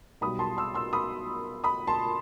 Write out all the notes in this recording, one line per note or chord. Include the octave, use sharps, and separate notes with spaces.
B1 B2 G3 B5 D#6
A5 C6
C6 E6
C6 E6
B5 D#6
B5 D#6
A5 C6